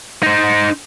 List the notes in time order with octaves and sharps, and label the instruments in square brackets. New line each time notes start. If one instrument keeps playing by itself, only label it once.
[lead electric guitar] D#4 C5